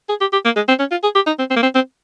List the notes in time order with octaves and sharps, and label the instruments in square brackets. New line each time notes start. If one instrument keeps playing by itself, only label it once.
[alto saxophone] G#4
G4
G4
A#3
G#3
C4
C#4
F4
G#4
G4
D#4
C4
C4
A#3
C4
C4